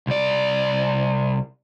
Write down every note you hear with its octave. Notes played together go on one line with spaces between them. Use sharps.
C2 D5